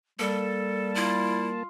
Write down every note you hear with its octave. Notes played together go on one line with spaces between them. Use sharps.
G3 A#3 A4 A5
E4 F4